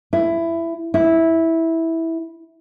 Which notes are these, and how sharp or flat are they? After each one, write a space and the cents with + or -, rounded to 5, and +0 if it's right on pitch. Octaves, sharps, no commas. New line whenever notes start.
E4 +15
E4 -10